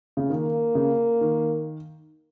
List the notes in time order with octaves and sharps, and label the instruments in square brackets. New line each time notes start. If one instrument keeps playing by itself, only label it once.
[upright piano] C#3
[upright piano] D#3 [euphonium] A#3
[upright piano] C#3
D#3